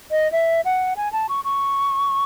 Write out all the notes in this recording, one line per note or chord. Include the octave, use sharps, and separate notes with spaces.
D#5
E5
F#5
G#5
A5
C#6
C#6